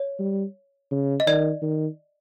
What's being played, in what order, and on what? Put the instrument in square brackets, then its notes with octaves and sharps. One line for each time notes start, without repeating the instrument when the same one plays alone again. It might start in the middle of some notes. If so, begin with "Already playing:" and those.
Already playing: [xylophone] C#5
[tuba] G3
C#3
[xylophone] D#5
[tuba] D#3 [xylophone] D5
[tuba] D#3